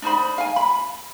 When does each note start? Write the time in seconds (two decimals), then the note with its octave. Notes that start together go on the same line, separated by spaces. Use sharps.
0.02 D4 D#4 C5 B5
0.38 F5 G#5
0.56 B5